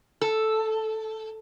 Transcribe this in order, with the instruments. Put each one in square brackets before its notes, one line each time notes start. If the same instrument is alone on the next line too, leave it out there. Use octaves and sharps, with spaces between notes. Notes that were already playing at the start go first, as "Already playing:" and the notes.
[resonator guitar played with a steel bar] A4